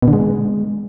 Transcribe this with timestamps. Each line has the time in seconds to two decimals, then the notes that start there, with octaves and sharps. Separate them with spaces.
0.02 B2
0.08 D3
0.13 G#3